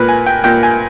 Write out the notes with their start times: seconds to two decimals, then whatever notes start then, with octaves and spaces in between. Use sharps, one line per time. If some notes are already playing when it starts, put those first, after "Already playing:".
Already playing: A#2 A#3 B4
0.09 G#5
0.27 G5
0.44 A#2 A#3 G5
0.63 G#5